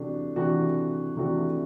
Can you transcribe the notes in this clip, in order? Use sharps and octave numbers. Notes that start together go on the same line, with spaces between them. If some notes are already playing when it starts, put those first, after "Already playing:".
Already playing: C3 E3 A3 D4 F#4
C3 E3 A3 D4 F#4
C3 E3 A3 D4 F#4